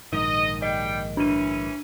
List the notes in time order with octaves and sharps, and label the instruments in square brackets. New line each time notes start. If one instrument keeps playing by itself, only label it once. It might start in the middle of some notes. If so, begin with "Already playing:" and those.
[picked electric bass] A#1 G#2 D#3 [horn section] D#5
[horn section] G3 G5 [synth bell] D#5
[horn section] E3 C#4 [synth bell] D4 D#7